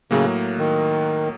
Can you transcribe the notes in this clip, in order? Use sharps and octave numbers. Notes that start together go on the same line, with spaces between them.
A2 C#3 F#3 A#3
D#3